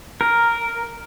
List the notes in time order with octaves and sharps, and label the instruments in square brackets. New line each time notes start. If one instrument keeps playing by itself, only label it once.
[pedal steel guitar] A#4